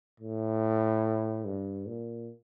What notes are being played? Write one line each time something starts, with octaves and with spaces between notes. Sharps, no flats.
A2
G2
A#2